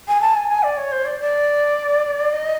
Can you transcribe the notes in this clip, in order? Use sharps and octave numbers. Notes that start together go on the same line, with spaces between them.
G#5
A5
G#5
G#5
D5
C#5
C5
D5
D5
D#5